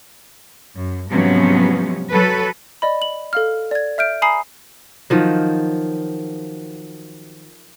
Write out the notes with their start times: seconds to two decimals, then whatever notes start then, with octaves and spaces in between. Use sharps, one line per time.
0.75 F#2
1.10 G#2 C3 F3 F#3 B3 C#4
2.11 F#3 A4 B4
2.82 D5 D#5 B5
3.02 F#7
3.33 A4 F5 F6
3.71 D5 G#6
3.98 E5 F6 G6 D7
4.22 G#5 A#5 B5 D#6 C7
5.10 D#3 F3 F#3